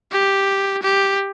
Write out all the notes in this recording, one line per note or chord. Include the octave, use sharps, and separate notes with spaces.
G4
G4